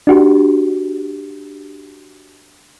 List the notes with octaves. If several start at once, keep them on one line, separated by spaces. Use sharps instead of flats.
D4 F#4 G4